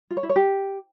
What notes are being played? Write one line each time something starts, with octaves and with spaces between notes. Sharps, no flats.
F4
C#5
E4
C#5
G4